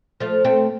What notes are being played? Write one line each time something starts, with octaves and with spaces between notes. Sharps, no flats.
F3 A3
A3 C4